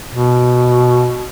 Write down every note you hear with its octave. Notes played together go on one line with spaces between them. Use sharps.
B2